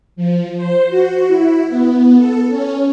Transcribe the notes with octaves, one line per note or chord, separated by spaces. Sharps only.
F3
C5
F#4
E4
B3
A4
C#4